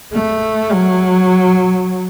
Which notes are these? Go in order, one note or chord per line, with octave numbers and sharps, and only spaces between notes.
A3
F#3